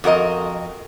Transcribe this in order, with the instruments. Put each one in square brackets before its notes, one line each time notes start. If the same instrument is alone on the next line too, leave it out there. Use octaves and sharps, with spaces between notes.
[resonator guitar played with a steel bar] F2 F#4 A#4 D#5